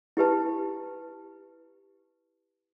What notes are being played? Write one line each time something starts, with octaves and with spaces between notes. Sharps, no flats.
E4 G4 B4 A5